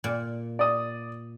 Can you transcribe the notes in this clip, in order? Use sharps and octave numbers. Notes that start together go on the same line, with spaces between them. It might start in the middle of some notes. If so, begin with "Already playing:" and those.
A#2
D5 D#6